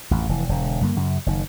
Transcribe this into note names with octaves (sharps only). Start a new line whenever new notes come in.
A1 F2
F1 E3
E1 D3
G2 D3 A#3
F#2 C#3
F#1 D#3